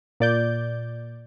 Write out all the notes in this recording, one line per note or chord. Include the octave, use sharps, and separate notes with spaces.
A#2 D5 G6